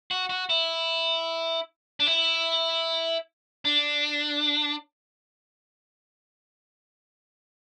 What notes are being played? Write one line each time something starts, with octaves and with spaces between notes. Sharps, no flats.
F#4
F#4
E4
D4
E4
D4